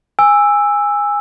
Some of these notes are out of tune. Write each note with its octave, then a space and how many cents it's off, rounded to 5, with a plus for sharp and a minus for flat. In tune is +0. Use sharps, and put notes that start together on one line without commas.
G#5 -15 E6 +0